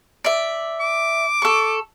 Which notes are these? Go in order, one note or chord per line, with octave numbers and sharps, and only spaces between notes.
D5 E5
D6
A4 C#6